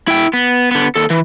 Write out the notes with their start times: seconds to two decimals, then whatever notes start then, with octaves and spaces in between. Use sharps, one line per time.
0.08 E4 G5
0.33 B3
0.71 D3 B3
0.95 D#2 A4
1.10 E3